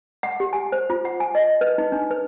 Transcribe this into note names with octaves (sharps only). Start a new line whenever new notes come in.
F#5
G4
G#5
C5
F4
F#5
G#5
D#5
B4
D#4
D4
B4